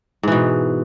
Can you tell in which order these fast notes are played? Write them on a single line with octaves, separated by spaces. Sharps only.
G#2 E3 B2